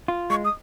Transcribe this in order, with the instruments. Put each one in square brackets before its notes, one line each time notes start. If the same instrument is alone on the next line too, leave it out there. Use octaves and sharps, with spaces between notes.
[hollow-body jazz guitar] F4
[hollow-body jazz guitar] G#3 [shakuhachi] C#6
[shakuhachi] D#6